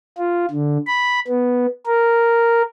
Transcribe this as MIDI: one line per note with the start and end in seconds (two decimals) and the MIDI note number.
0.18 0.46 65
0.50 0.77 50
0.87 1.20 83
1.28 1.66 59
1.86 2.62 70